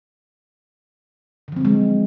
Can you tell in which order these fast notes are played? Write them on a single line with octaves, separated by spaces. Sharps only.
D3 F3 C4 F#3 G#3